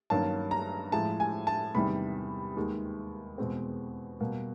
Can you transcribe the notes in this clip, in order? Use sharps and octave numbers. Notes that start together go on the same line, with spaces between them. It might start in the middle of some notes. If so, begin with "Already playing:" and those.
G2 D#3 F#3 A#3 C#4 A5
A#5
A2 F3 G#3 A5
G#5
A5
E2 C3 D#3 G3 B5
D#2 D#3 G#3
E2 B2 G#3 C4
B2 G3 A#3